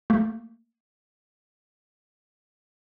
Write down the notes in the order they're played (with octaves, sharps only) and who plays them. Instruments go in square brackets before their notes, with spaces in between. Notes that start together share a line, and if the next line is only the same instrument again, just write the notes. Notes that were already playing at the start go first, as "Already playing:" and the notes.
[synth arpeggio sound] A3 A#3